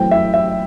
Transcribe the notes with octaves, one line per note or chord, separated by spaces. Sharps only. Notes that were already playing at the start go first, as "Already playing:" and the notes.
Already playing: F#2 E3 A3 C4 G5
E5
E5